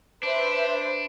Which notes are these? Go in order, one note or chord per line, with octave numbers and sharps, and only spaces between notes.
D4 B4 C5 E5